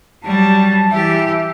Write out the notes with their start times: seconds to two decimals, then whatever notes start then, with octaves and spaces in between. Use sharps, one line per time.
0.24 F#3 G3 A5
0.91 E3 G4 E5